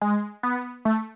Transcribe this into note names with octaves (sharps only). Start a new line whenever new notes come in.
G#3
B3
A3